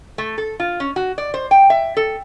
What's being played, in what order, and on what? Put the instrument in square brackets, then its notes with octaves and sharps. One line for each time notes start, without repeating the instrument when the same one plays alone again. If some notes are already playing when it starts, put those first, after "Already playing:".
[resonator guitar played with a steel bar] A3
A4
F4
C#4
F#4
D5
C5
G5
E5
A4